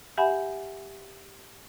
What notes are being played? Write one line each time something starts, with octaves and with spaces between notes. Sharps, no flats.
G4 E5 F#5 G#5 B5